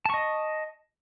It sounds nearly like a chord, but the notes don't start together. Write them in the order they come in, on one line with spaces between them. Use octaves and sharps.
A5 C#6 D#5